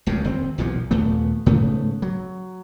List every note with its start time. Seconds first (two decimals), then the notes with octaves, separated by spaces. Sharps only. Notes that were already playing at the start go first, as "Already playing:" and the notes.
0.06 D1 C#2 F#2 C#3
0.25 D#1 C4
0.58 B1 E2 A#2 F3
0.91 D#2 A#2 A3 B3
1.46 G#2 C#3 A3 B3
2.02 F#3